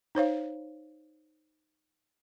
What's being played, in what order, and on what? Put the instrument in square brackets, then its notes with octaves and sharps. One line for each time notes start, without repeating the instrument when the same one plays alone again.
[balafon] D#4 C5 C#5 F5